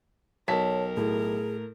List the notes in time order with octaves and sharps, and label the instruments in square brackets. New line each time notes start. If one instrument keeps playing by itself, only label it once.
[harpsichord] B1 [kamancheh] A#4 [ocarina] C#5 [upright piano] A5 B6
[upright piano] A2 [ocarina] G#4